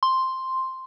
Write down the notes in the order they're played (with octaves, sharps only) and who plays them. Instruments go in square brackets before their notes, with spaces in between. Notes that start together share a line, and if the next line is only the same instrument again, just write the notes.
[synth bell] C6